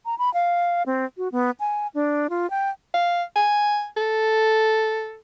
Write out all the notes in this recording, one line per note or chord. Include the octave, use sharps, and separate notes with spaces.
A#5
B5
F5
C4
F#4
B3
G#5
D4
F4
G5
F5
G#5
A4